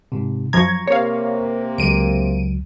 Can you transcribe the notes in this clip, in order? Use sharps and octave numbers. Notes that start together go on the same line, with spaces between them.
G#2 C3
F#2 F3 A#5 C#6 G#6
C3 A#3 C#5 F5
C#2 F#3 D7 D#7